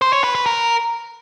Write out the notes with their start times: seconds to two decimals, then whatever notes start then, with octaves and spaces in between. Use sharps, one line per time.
0.02 C5
0.13 C#5
0.24 B4
0.35 B4
0.46 A#4